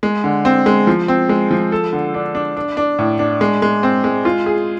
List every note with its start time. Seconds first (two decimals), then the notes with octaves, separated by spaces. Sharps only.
0.03 G#3
0.24 D3
0.45 C4
0.66 G#3
0.87 F3
1.08 C4
1.29 G#3
1.51 F3
1.72 A4
1.92 D3
2.14 D4
2.35 D4
2.57 D4
2.77 D4
2.99 A2
3.19 D4
3.41 G#3
3.62 G#3
3.83 C4
4.04 G#3
4.25 F4
4.46 G#4